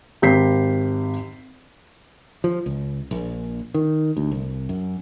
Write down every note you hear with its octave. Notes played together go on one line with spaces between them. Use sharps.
G#1 G4 G6 B6 C7
F3
C#2
A#1
D#3
D2
C2
F#2